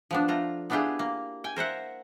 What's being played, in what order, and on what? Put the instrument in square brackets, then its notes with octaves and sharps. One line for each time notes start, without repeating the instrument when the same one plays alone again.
[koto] F3 B3 D4
A3 F4 A#5
B3 D4 E4 F4 G4 G#4
A#3
G5 G#5
A#4 C5 E5 F#5